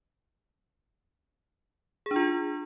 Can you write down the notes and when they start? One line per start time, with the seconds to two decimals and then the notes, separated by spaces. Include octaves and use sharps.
2.06 G#4
2.11 D4
2.16 F4